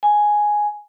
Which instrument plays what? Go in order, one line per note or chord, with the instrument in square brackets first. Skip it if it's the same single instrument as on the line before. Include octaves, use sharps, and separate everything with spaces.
[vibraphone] G#5